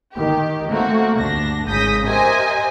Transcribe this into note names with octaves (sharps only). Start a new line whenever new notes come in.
D#3 G4
A3 A#3 C4 F#4
D2 G2 D4 A#6
G#1 C#3 D#6 G6 A#6 B6
G4 A#4 C5 D#5 E5 G#5